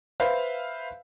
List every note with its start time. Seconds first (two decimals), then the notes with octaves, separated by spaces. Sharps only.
0.20 B4 C5 E5 F5